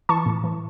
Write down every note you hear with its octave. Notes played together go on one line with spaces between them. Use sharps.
E3 A5 C#6
A2
E3